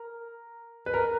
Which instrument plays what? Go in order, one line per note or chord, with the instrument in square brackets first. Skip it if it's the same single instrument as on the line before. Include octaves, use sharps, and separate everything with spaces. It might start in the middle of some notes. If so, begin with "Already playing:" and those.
Already playing: [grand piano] A#4
B4
A#4